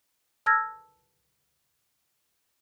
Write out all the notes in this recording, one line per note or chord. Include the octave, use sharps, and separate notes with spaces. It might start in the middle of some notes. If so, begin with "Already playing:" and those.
A5 E6 F6 G#6 A#6